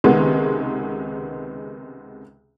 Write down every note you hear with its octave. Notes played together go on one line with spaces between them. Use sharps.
C#2 C3 D#3 G#3 B3